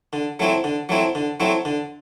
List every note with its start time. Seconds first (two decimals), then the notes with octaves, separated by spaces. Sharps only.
0.13 D3
0.39 F#3 A3 C4 E4
0.64 D3
0.89 F#3 A3 C4 E4
1.15 D3
1.40 F#3 A3 C4 E4
1.65 D3